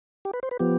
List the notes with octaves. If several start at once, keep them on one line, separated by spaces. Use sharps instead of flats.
G4
B4
C5
B4
F3 B3 G4